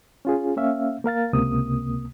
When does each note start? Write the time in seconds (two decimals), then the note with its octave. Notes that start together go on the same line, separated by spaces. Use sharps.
0.25 C#4 F4 G#4
0.57 A#3 C#4 E5 F5
1.04 A#3 A#4 F5 A6
1.33 C#2 C3 A#3 D#6